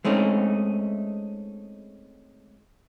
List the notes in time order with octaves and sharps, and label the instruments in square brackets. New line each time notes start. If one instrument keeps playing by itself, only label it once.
[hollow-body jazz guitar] G#3 A3 C4 C#4 D#4